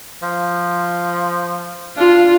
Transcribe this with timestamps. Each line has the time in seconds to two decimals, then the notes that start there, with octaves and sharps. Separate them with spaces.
0.23 F3
1.97 D4 F4